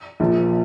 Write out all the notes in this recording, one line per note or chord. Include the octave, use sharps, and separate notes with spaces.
A#1 A#2 F3